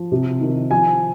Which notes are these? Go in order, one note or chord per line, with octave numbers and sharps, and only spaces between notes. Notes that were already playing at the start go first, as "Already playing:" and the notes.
Already playing: F3
C3
D#3
F3 G#5